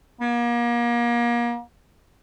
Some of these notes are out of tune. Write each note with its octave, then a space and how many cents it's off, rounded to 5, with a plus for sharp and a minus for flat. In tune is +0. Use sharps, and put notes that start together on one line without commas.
A#3 +35